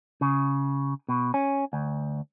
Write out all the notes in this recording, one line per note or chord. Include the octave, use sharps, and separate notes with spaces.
C#3
B2
C#4
D2